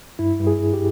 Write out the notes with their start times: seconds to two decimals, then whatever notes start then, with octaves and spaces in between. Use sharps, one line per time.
0.19 G2 E4
0.40 G2
0.47 G#4
0.59 G2
0.74 G4